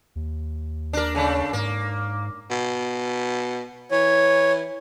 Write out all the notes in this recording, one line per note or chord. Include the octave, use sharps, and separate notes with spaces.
D#2
D4 A#4
C#3 A3 D4
G#2 A#3
B2
E3 C#5